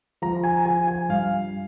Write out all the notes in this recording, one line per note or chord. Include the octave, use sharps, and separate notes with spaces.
F3 A#5
G#5
F3 G#5
G#5
G2 F5